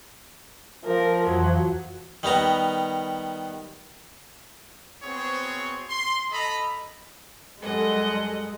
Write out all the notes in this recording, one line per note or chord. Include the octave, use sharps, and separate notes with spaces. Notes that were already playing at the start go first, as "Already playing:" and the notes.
F3 A#4
F2 E3 F#3
D#3 G3 B3 A#5
B3 C4 F#4 G#4 C5 C#5
C6
A4 D#5 A#5 B5
F#2 G3 G#3 A4 D#5 F#5